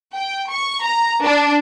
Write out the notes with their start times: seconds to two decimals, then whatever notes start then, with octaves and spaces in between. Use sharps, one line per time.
0.16 G5
0.51 C#6
0.82 A#5
1.26 D4